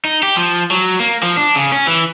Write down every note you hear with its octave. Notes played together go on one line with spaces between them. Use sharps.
D#4
G4
F3
F#3
A#3
F3
D4
C#3
C#4
E3